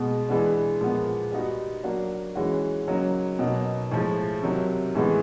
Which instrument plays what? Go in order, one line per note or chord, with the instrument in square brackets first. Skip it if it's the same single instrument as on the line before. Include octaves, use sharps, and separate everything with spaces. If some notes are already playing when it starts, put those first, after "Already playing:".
Already playing: [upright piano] B2 G#3 B3
E3 G#3 B3 D4
A#2 F3 G#3 B3
G3 B3 D#4 F#4
F#3 A#3 D4 F#4
E3 G#3 C#4 F#4
C#3 F#3 A#3 D#4
B2 F#3 A#3 D#4
A2 F3 G#3
C3 D#3 F#3
A2 E3 G#3 B3